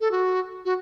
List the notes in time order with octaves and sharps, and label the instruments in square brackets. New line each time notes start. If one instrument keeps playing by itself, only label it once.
[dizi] A4
F#4
F#4